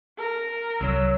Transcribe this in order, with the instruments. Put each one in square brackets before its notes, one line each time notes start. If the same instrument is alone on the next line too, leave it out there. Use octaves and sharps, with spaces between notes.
[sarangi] A#4
[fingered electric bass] C2 [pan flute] F#3 [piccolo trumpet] E6